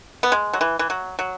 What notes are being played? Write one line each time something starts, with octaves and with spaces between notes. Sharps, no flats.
B3
G#3
F#3
E3
E3
F#3
F#3